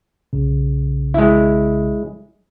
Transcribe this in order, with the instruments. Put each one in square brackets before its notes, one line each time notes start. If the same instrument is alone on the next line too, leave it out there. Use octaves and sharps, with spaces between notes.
[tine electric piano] B1 C#3
[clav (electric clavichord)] G#3 E4